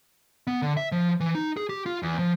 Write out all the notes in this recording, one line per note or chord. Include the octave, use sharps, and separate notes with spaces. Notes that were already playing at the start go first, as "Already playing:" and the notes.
B3
D3
E5
F3
E3
D#4
G#4
G4
F4
E2
F3